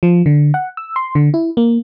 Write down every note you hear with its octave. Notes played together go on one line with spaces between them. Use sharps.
F3
D3
F#5
E6
C6
D3
E4
A#3